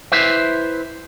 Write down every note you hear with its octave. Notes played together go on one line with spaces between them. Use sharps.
E4 B4 C5 E5